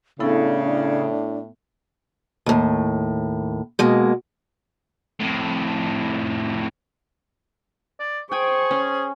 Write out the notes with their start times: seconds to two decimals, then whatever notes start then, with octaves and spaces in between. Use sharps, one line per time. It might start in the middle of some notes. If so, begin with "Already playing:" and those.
0.20 A2 C#3 B3 D4 E4 A4
2.46 D#2 A2
3.79 B2 G#3 A#3
5.20 F2 A2
7.99 D5
8.32 G#4 C5 G5 G#5 C#6
8.71 C#4